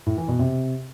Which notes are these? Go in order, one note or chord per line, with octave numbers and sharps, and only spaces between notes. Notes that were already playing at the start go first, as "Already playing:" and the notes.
A2
E3
B2
C3